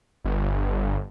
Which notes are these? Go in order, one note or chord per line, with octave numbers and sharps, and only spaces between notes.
G1